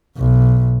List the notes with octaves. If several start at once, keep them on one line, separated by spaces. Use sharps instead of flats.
B1